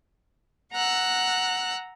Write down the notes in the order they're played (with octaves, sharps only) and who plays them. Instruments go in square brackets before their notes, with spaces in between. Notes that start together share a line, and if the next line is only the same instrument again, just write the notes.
[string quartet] F#5 A#5 E6 F#6